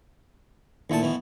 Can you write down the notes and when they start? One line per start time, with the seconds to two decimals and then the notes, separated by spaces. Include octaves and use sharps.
0.90 D2 A#2 D#3 E4 A5
1.02 F2 B2 E3